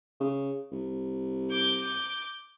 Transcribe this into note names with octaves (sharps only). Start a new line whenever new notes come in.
C#3
C2
D6 G6